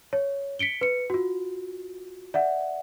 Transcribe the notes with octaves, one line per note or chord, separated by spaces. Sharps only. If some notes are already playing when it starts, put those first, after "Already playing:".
C#5
B6 C#7 D7 G7
B4 C#7
F4 F#4
D5 E5 F#5